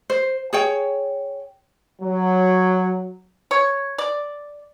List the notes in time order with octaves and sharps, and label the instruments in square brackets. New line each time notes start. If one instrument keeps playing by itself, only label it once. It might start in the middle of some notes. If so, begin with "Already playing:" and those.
[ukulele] C5
G#4 C#5 G5
[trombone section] F#3
[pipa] C#5
D5